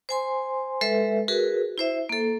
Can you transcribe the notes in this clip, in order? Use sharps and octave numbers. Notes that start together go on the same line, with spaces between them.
C5 G#5 C6
G#3 A4 B4 E5
F#4 G#4 A#4 B4
E4 C5 E5
A#3 A4